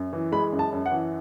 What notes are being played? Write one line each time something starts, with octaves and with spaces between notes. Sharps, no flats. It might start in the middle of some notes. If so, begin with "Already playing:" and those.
Already playing: F#2
E3
G#3 B5
F#2
A5
F#2
F#5
E3